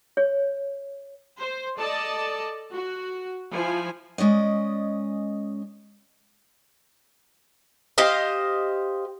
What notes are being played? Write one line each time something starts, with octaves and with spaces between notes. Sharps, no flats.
C#5
C5
A4 D5 D#5 A5
F#4
F3 E4 G#5
G#3 C#4 D5 D#5
G4 C5 D#5 F5